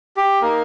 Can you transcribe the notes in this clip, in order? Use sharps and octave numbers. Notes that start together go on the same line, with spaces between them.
G4
A#3 D#4 A#4